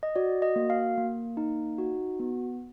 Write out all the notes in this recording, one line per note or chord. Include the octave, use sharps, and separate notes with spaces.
D#5
F#4 D5
D#5
A#3
F5
A#3
D#4
F#4
B3